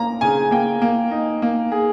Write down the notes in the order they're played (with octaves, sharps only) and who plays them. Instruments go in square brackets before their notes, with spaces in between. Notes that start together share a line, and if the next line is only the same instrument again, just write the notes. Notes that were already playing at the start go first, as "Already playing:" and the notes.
Already playing: [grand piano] A#3 [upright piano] A#5
[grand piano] C#3 [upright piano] G#5
[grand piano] A#3 [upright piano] G5
[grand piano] A#3
D#4
A#3
G#4